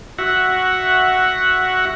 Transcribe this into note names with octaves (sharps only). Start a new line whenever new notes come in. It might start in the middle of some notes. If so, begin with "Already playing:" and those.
F#4 E5 F#5